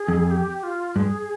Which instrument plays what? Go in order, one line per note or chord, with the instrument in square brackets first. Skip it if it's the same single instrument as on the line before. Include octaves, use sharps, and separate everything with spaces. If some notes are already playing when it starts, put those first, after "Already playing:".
Already playing: [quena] G#4
[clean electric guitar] F2
[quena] G4
F4
[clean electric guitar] G2 [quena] G#4